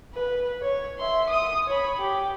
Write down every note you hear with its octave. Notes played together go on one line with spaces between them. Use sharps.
B4
C#5
E5 C6
D#6
C#5 B5
G4